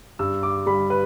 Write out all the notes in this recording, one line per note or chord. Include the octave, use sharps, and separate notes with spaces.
G2 E6
D6
G3 B5
B4